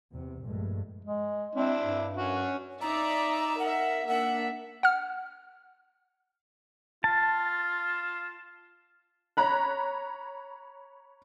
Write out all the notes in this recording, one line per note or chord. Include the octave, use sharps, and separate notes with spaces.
E2 C3
A#1 G2 G#3 A3
G#3
C4 D4 E4
G2
C#4 F#4
D#4 D5 E5 A#5
A#4 E5 F#5
A#3 D4 E5 F#5
F#5 F6
F4 A5
C#5 A#5 B5 F#6